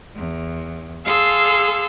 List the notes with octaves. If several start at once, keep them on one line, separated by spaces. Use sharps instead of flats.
E2
G#4 A4 F5 C6 E6